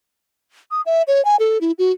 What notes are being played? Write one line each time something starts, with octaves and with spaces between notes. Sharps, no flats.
D#6
E5
C#5
G#5
A4
E4
F#4